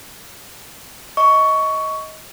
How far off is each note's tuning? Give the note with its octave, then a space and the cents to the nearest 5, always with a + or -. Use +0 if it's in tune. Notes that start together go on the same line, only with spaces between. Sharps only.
D#5 +15 C#6 +15